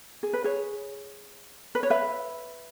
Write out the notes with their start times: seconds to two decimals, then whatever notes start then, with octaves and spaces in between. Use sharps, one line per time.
0.23 G#4
0.33 B4
0.44 G#4 C#5
1.75 B4
1.83 C#5
1.90 B4 E5